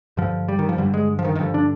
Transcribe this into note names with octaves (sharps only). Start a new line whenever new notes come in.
G2 D3 F3
G3
D#3
F3
G2 D3 G3
G#3
F3
D#3
D#3
G2 D3 F3
D4